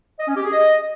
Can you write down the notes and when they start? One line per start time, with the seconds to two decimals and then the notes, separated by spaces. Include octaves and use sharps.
0.20 D#5
0.28 C#4
0.36 G4
0.45 G#4
0.53 D#5